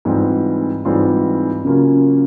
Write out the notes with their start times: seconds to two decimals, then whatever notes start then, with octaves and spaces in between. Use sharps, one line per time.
0.05 G#2 E3 G3 C4 F4
0.85 G#2 E3 G3 C4 F4
1.65 C#3 F#3 A#3 C#4 F4